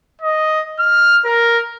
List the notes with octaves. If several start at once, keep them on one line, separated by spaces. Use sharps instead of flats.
D#5
F6
A#4